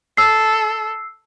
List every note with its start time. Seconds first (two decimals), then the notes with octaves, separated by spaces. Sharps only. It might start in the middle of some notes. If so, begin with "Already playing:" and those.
0.17 A4 E6 C7